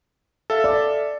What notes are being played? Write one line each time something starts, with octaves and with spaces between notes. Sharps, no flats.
A4 E5 F5
D5